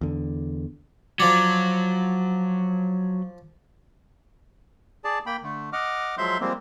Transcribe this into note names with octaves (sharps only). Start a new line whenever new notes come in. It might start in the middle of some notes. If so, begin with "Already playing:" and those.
E2 D3
F3 F#3 D5
G#4 D5 A5
A#3 G5 B5
D3 A3
D#5 F#5 D6 F6
F3 F#3 G#3 E5 C6 G6
F3 G3 G#3 A#3 C4